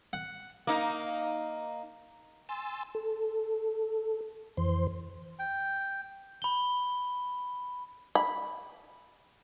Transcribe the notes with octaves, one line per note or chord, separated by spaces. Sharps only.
F#5
A#3 D#4
G#5 C6 E6 A6
A4
F2 E3 C5 C6
G5
B5 G7
B5